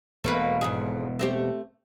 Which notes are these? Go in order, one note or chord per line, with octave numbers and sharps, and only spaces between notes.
E1 B2 A3 A#3 B4
F2 G#2 G#4
A3 C4 G4